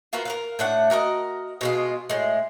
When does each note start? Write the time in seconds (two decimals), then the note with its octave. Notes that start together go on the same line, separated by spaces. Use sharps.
0.13 F4 F#4 A#4 B4
0.25 A#4 B4 F5
0.59 A2 D4 F#5
0.90 F#4 A#4 C#5 D#5
1.61 B2 G#3 F4
2.10 A2 G#3